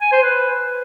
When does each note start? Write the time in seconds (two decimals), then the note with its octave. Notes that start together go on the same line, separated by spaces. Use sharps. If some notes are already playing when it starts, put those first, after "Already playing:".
0.01 G#5
0.12 C5
0.23 B4